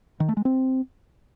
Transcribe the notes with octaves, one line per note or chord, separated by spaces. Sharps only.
D#3
A3
G#3
C4